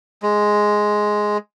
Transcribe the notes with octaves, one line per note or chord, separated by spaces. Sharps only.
G#3